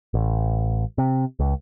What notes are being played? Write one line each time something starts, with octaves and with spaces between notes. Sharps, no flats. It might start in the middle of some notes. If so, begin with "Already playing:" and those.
A1
C3
C#2